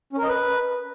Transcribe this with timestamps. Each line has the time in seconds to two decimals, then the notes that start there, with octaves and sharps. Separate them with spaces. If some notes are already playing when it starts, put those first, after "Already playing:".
0.13 C#4
0.18 A#4
0.23 D#5
0.28 B4